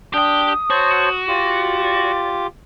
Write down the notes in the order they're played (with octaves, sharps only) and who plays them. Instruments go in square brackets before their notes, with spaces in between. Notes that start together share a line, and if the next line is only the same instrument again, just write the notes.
[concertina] D4 [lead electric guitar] G4 G5 [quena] D#6
[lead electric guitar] F#4 [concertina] C5 C#5 A5
[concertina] F4 G4 D6 [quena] D5